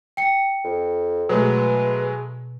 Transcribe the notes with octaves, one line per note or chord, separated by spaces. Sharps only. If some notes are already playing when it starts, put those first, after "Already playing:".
G5 C#7
F2
B2 F#3 G#3 A3 B4